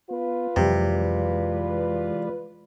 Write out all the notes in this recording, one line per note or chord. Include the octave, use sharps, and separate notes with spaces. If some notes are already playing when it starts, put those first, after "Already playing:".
B3 F4 B4
F2 C3 E3 F#3 G#3 D5